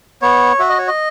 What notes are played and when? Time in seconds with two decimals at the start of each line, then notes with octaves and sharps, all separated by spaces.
0.22 B3 C#5
0.59 F#4 E5
0.69 D#5
0.78 C#5
0.88 D#5